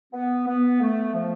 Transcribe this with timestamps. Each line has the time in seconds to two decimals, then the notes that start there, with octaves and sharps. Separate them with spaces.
0.13 B3
0.47 B3
0.81 A3
1.14 F3